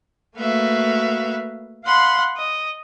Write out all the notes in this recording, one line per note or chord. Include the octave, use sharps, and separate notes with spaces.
A3 A#3 F#4 B4 E5 F5
F5 F#5 B5 C6
D#5